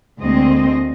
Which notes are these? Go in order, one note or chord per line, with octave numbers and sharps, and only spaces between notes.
D2 G#3 A#3 C4 D#5